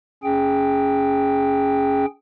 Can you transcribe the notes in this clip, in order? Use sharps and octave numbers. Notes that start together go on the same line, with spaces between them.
C#4 G#4 G5